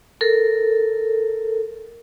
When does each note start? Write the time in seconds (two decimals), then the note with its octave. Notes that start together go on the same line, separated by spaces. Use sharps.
0.21 A4 A#4